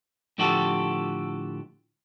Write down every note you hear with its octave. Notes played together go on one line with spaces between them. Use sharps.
A2 D3 F3 F#4 G4 A4